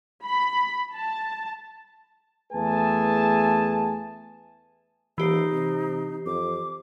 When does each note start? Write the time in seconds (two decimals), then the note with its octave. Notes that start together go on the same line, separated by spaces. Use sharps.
0.25 B5
0.94 A5
2.53 E2 A3 G#4 B4 G#5 A5
5.18 D#1 E3 D#4 G4 C7
5.51 C3
6.26 F2 D6